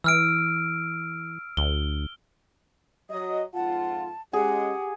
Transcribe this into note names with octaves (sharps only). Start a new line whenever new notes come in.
E3 E6 F6 D7
D2 G7
F#3 D#5 D#6
F2 G#2 F4 F#5 A5
G#3 C#4 G4 G#4 F#5